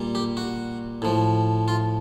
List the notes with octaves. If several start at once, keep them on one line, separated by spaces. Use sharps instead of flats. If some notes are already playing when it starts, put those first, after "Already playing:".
Already playing: A#2 G3
G4
F#4
A2 F3
F4